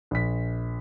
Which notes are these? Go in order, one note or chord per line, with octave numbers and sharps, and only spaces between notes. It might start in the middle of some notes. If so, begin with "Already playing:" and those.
A#1 B6